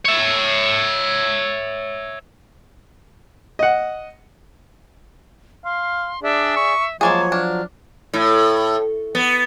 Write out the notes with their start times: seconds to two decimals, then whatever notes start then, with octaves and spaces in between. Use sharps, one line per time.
0.05 C#5 E5
3.59 D#5 F#5
5.65 F5 C6
6.23 D4 G#4 D5 E5
6.56 C#6
7.01 F3 F#3 G#3 A#3 G#4 C#5 A5
7.32 D4 F6
8.13 A2
9.15 B3